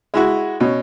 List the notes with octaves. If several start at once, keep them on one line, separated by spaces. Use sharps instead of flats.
G#3 E4 F#4
B2 C#4